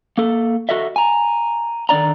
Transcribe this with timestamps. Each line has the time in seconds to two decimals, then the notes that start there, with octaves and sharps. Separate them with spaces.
0.18 A#3 A4
0.69 F#4 A4 D#5 E5
0.96 G#5 A#5
1.89 D3 D#3 D4 D5 A#5